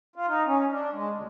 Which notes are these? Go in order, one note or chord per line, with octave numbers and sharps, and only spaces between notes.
F4
D#4
C#4
D4
G#3
D2